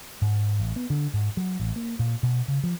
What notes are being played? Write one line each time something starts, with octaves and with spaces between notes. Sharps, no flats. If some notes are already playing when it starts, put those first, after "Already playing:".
G#2
A1
B3
D3
G#2
F#3
A1
A#3
A#2
B2
C#3
F3